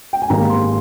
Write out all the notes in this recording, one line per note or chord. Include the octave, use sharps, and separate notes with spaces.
G5
G#5
G#1 G#2 D#3 G3 A#3 A#5
C6